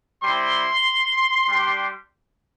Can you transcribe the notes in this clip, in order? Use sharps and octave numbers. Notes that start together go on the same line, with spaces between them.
G3 C4 E4 C6
G3 D4 G4